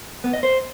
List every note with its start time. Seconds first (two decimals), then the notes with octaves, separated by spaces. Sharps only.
0.24 B3
0.33 D#5
0.43 C5